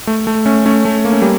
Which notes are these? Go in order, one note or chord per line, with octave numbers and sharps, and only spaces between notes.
A3
A3
A3 C#4
A3 C#4
A3
A#3
C#4
G3 A#3